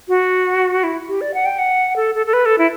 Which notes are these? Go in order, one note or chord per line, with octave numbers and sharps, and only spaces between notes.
F#4
E4
G4
D5
F#5
G5
F#5
A4
A4
A4
B4
A4
E4